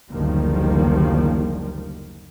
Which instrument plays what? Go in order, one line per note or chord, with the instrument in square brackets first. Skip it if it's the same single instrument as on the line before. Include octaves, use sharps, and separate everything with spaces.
[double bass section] F#1 D2 D#3 F3 G3 A#3